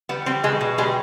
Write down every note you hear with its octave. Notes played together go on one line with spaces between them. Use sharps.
G3 B3
G3 C4
B2 G#3
B2
G3 G#3